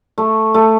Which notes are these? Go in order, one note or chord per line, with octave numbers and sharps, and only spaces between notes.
A3
A3